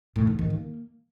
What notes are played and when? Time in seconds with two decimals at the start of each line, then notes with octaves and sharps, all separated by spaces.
0.16 A2
0.27 G#2
0.39 D#3
0.50 A#3